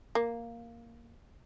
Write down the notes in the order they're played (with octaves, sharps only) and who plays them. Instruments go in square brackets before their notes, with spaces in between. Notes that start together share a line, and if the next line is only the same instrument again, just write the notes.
[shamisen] A#3